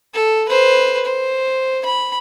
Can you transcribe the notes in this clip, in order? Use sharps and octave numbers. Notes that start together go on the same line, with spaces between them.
A4
B4 C5
C5
B5